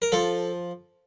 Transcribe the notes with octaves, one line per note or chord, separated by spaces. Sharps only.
A#4
F3 A4